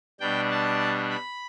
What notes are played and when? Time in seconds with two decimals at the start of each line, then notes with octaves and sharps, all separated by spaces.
0.20 B2 G3 D4 G5
0.51 A5
1.10 B5